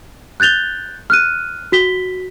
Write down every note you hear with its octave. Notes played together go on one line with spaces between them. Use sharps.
F#6 G6 A6 F7 G7
F6 F#6 D#7
F#4 B6 G7